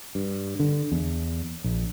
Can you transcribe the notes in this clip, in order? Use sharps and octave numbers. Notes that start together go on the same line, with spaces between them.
G2
D3
E2
A#1